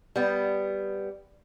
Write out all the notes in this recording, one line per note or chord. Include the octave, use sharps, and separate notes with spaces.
G3 B3